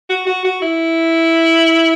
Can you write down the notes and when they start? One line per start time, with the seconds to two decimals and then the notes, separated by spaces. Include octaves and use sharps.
0.09 F#4
0.27 F#4
0.44 F#4
0.61 E4